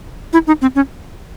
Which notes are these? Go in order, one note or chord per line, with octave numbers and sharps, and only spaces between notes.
E4
D#4
C4
C#4